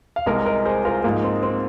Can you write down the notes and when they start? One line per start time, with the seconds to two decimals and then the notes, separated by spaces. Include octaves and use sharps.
0.16 F5
0.26 C2 C3 G#3 A#4 D#5
0.46 A#4 D#5
0.65 G#4 C5
0.85 F4 A#4
1.04 G#2 F3 G#3 A#3 D#4
1.24 C4
1.43 C4